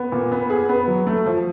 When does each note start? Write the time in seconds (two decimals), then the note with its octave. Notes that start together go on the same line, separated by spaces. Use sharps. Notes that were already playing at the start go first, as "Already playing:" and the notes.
Already playing: B3
0.12 A#2
0.32 B3
0.50 G#4
0.69 B3
0.88 F#3
1.07 A3
1.26 F3